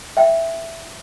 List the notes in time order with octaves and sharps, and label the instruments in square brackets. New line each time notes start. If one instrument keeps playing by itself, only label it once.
[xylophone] E5 G5